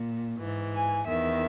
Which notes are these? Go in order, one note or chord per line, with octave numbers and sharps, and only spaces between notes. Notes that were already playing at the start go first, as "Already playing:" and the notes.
Already playing: A#2
G#2 E3
G#5
E2 D#3 E5